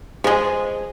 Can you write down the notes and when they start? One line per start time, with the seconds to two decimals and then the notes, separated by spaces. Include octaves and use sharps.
0.24 F3 G#3 G#4 D#5